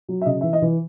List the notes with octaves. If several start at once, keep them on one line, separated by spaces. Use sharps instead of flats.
F#3
E5
C#3 D#5
E3 E5
D#5
E3